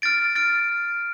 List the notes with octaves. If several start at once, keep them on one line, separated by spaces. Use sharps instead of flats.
F6 A6 D7
F6 A6 D7